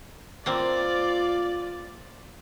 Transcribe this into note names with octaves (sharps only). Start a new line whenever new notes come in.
A#3 C4 F4 D5